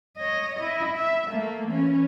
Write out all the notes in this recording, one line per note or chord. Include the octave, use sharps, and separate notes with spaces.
C#5 D#5
E4 D#5
E5
A3 A#3
E3 C#4